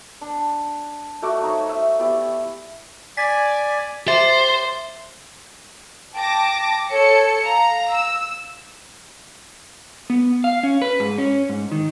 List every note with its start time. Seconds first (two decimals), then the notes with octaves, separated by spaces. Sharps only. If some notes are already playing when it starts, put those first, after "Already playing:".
0.21 D4
1.22 A3 F#4 D#5 D6
1.43 D#4 C5 C#5
1.69 E5 E6
1.99 B3 E4 G4 D5
3.17 D5 G#5 B6
4.08 G4 C5 E5
6.15 G5 A5 D6 A#6
6.91 A4 C#5 C#7
7.45 F5 A#5
7.94 E6
10.10 B3
10.44 F5
10.63 C#4
10.82 B4
11.00 G#2
11.18 C#4
11.49 G#2
11.72 D#3